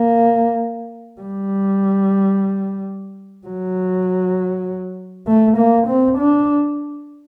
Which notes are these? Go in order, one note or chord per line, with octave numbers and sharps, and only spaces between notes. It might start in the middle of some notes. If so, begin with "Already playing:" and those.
Already playing: A#3
G3
F#3
A3
A#3
C4
D4